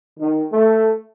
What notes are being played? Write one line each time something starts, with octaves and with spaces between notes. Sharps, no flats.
D#3
A3